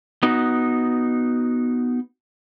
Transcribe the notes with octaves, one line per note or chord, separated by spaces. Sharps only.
B3 D#4 F#4